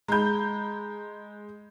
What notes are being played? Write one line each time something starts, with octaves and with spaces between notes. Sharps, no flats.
G#3 A#5 B5 G6